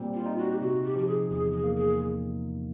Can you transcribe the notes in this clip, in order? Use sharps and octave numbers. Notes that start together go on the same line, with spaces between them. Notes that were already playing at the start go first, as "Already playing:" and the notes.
Already playing: A#2 G3 C4
F4
D#4
F#4
G4
C3 F#4
G4
F3 G4
G#4
E2 G#4
G#4
A#3
G#4